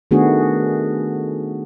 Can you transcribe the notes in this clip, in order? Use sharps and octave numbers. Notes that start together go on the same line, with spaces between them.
D#3 A3 B3 D4 F#4 G#4